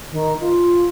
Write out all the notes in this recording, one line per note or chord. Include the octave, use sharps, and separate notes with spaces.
D#3
F4